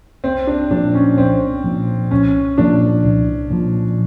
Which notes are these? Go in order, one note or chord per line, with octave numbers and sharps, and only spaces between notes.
C2 C4
D4
A#2 F3 D4
C#4
C2 C4
A#2 F3
C2 C#4
A#2 F3 D4
C2
A#2 F3